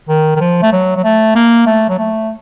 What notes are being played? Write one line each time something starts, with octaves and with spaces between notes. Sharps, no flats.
D#3
D#3
F3
A3
F#3
F#3
A3
A#3
A3
F#3
A3